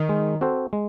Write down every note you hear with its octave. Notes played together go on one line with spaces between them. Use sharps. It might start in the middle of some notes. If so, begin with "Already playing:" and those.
Already playing: D#3
G#3
C4 F#4 A4 C5
G#3